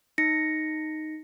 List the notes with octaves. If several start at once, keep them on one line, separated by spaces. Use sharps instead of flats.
D#4 A#6 C#7